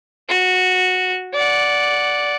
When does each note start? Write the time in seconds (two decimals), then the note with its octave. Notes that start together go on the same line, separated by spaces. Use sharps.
0.29 F#4
1.34 D5 F#5